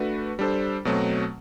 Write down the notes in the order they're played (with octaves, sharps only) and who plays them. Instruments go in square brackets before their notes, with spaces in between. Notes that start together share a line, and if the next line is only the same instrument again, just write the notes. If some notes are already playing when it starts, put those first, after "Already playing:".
Already playing: [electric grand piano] A3 D4 F#4 B4
G3 D4 A4 C5
B2 F#3 A3 C4